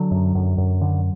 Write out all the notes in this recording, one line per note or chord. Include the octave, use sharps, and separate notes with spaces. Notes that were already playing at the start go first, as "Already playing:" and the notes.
Already playing: D3 F#3
F#2
F#2
F#2
D3